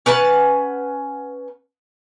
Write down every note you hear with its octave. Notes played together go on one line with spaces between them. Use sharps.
C#4 B4 F#5 A5